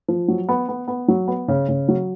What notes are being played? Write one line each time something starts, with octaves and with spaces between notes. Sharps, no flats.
F3
F#3
B3
B3
B3
F#3
B3
C#3
C#3
F#3